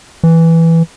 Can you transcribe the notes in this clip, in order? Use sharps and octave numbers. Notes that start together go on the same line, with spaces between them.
E3